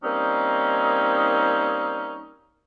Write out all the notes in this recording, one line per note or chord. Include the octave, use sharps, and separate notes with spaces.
G3 A#3 C4 C#4 D#4